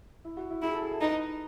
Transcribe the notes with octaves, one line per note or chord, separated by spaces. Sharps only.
E4
F#4
E4
E4 G#4
A4
G#4
A4
D#4 B4